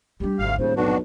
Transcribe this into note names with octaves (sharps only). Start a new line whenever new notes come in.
G3 D4 G4
G#1 D2 F5
D#1 A2 C#3 C5
B1 F2 D4 F#4 B4